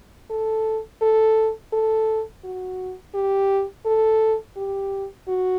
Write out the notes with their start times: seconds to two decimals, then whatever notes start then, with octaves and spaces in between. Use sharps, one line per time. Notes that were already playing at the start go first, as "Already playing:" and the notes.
0.30 A4
1.02 A4
1.73 A4
2.44 F#4
3.15 G4
3.86 A4
4.57 G4
5.28 F#4